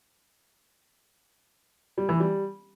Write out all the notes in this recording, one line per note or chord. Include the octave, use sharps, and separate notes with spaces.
G3
E3
G3